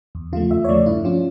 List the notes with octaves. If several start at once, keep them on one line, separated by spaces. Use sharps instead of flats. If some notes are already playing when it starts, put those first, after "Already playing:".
E2
C#3 F3 A3 F4
E2 E5
C#5
C#3 F3 A3 D5
G2 E4
F3 C#4 F4